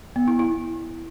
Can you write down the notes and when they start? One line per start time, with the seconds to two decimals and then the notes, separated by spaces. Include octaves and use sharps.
0.16 B3
0.28 E4
0.39 E4